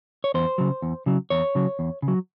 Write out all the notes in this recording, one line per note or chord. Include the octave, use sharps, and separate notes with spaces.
C#5
E2 C5
C#3 F#3
E2
C#3 F#3
E2 C#5
C#3 F#3
E2
C#3
F#3